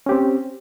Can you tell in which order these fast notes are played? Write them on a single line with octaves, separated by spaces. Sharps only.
C#4 G4 C4